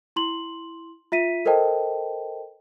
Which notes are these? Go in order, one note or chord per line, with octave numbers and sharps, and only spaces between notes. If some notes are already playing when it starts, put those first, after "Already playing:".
E4 C6 F#7
F4 E5 B6 D#7
A4 A#4 C5 D#5 G5 A5